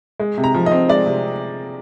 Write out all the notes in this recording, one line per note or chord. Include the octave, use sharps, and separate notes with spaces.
G#3
C3
A#5
F3
D#5
C4
G#3 D5
C3